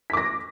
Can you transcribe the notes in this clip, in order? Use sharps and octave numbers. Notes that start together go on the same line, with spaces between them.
D6 A#6 B6